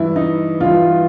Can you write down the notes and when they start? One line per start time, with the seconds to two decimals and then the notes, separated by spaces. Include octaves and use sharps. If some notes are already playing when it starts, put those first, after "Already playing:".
Already playing: G2 E3 E4
0.16 D#4
0.60 G2 E3 F4